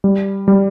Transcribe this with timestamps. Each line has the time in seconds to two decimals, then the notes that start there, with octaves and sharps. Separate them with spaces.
0.04 G3
0.48 G3